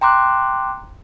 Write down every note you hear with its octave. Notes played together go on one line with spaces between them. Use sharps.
G5 A#5 C6 D6 F#6